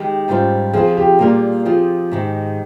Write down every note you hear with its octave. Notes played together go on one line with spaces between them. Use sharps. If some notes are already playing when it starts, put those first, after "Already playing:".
Already playing: D#3 G#3 G4
G#2 G3 C#4 F4 C5
F3 C4 F4 G#4 C5
G4
A#2 G3 A#3 F4 G4 A#4
F3 C4 F4 G#4
G#2 D#3 G#3